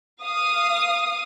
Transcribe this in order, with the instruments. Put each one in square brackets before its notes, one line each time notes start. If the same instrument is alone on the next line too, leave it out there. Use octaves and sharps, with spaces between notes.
[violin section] F5 D#6